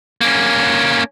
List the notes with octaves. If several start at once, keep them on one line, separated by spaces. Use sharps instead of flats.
A#3 C#4